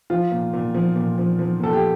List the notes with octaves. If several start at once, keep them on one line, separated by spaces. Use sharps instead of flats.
F3 F4
A#2
A#2
F3
A#2
F3
F3
A#2 A4
G4